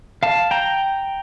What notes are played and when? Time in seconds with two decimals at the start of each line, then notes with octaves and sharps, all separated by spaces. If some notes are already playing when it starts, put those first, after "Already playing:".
0.23 F5 A5
0.51 G5 A#5